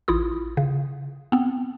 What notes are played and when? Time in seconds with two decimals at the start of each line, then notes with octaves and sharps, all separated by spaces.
0.08 A1 E4 F4 D#6
0.57 C#3
1.32 B3 C4